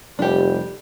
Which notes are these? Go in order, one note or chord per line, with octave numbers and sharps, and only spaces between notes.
F1 G3 D4 G4